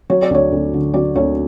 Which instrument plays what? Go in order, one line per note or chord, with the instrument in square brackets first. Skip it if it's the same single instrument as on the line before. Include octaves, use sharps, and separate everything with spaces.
[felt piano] F#3 C#5
D5
D2 C#5
D2
D3
F#3 D5
D2 C#5